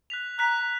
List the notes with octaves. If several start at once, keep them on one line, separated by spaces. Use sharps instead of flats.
F#6 B6 F7
A#5 F#6 B6 F7